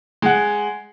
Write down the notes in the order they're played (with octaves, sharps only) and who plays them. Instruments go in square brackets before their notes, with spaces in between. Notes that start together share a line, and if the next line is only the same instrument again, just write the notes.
[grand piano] G#3 F#5